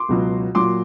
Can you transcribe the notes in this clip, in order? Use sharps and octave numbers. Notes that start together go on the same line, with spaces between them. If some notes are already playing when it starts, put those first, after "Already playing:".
Already playing: C6 D6
C#2 B2 F#3
A#2 F#3 C6 D6